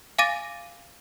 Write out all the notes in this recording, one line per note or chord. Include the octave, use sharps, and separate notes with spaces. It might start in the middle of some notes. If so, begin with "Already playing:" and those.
F5 G#5 D6 A6 A#6 D#7